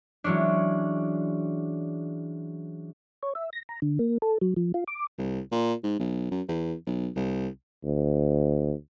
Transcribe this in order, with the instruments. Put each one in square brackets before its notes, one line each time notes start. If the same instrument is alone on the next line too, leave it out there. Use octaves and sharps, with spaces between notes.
[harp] E3 F#3 G#3 C#4 D4
[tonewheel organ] C#5
E5
A#6
A#5
D3
A#3
A4
F#3
F3
F4
D6
[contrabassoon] C2
A#2
G#2
B1
F#2
E2
B1
C2
[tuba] D2